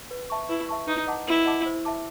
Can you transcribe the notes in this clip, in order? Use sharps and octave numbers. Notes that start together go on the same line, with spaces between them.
B4
E5 A5 C#6
E4 B4
E5 A5 C#6
D#4 B4
D#5 F#5 A5 D6
E4 B4
D#5 F#5 A5 D6
C5
E5 A5 D6